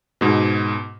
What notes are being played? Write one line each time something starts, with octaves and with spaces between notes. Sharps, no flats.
G#2 B2